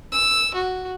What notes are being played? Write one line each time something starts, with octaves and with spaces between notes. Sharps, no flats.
E6
F#4